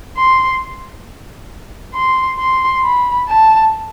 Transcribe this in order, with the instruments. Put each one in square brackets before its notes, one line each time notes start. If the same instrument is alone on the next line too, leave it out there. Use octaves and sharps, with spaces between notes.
[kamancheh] C6
C6
C6
B5
A5